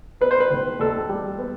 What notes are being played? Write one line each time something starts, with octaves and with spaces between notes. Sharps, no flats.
B3 B4
C5
B4
D#3
D#2 A4
G3
B3